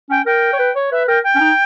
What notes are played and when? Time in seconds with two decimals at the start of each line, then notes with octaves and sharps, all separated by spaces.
0.10 C#4 G5
0.26 A#4 G5
0.53 C#5
0.59 B4
0.76 C#5
0.92 B4 E5
1.08 A#4 G5
1.24 G5
1.35 C#4
1.40 D#4